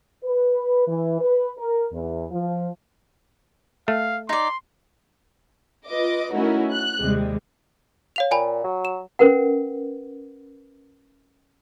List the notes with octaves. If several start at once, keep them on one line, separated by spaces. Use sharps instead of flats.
B4
E3
B4
A#4
E2
F3
A3 F5
D#4 D5 C6
F4 B4 D#5 D6
A3 C#4 D#4 E4 F#4 A#4
F#6
D#2 C3 G3 G#3
C#5 F5 F7
A#2 G5 G#5 B5
F#3
E7
C#4 A#4 B4 F#5